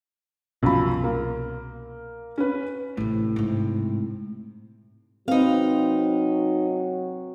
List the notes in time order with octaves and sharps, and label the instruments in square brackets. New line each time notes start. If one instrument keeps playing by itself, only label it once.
[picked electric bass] C2 B2 [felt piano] F#2 F3 B5
[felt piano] A#3
C#4 B4
[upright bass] A1 C3 [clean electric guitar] A2
[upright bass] G#2 C3
[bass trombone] F#3 [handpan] C4 B4 [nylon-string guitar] D#4 F5